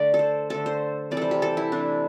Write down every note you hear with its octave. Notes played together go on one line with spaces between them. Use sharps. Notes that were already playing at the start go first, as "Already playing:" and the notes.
Already playing: D3 A3 D5
A4
C5
D3 A3 A4
C5
C3 E3 G3 D5
A4 C5
G4
A4
E4
C3 E3 A3 D4